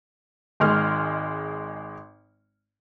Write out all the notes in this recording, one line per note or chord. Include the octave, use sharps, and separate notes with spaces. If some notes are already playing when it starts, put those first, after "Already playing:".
G#1 G#3 C6 F6